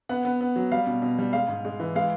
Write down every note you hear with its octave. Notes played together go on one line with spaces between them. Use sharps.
B3 F#5
B3
B3
F#3
G3 F5
B2
B2
G3
G#3 F5
G#2
G#3
E3
G#3 F5